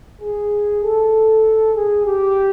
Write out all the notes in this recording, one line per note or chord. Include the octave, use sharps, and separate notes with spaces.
G#4
A4
G#4
G4